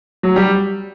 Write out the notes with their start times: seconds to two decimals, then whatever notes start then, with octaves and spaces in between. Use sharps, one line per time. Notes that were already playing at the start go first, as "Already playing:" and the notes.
0.23 F#3
0.36 G3